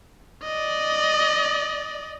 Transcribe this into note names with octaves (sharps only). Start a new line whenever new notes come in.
D5 D#5